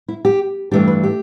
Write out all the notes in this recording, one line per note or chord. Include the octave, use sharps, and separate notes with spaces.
E4
G4
G2 E3 A3 D4 G4
B4
G4